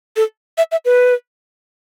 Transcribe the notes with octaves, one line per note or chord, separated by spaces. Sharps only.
A4
E5
E5
B4